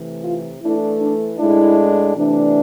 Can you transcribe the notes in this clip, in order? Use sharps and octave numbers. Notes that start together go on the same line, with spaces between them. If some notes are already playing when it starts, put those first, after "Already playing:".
Already playing: C3 E3 A3
F4
E3 A3 D4 E4
D4
A2 G#3 D4 E4
C3 E3 A3 D4